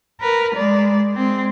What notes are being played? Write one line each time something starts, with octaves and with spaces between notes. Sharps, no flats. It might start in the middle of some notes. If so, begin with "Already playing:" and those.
A#4 B4
G#3 D5
G#3 C4